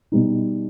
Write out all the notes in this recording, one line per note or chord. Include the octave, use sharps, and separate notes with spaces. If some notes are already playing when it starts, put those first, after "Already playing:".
B2 G3 D#4